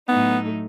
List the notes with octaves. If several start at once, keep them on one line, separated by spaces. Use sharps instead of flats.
A2 F#3 A3 B3 D#4